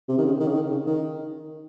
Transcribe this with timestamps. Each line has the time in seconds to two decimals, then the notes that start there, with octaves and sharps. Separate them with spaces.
0.08 C3
0.18 D#3
0.25 C#3
0.40 D#3
0.48 C#3
0.55 D#3
0.71 C#3
0.87 D#3